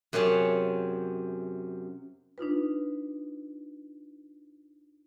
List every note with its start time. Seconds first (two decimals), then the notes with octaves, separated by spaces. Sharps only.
0.13 F#2 C3 G#4 C#5 A5
2.38 D4 D#4 F4 B4